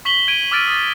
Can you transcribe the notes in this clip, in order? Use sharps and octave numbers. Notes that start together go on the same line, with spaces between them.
C#6 B6 F#7 G7
G#6 D7 D#7
D6 E6 F6 A6 D7 D#7
D#6 A6